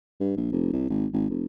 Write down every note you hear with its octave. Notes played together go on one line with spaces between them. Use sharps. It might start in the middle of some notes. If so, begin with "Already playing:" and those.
G2
A#1
F1
C2
G#1
G#1
F1